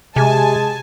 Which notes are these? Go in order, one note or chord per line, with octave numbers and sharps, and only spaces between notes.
C3 G#3 G#4 G#5 A5